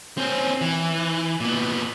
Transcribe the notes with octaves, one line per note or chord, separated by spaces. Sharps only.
C4 C#4
E3
A#2 B3